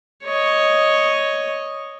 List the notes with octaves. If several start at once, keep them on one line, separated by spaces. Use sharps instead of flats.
C#5 D#5